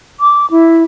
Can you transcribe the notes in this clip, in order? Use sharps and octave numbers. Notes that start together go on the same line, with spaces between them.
D6
E4